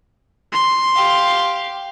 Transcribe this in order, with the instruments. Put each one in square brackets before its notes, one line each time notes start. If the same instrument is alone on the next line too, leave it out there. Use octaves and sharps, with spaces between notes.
[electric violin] C6
[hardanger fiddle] G4 F5